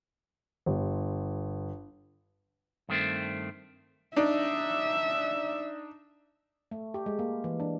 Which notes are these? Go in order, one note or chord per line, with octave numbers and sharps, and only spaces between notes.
G1
G2 D#3 A3 C4
D4 D#4 E5
A3
G4
G#3
A#3
E3
D4